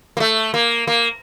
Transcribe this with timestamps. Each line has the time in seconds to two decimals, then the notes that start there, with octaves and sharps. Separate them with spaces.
0.17 A#3
0.20 A3
0.54 A#3
0.87 A#3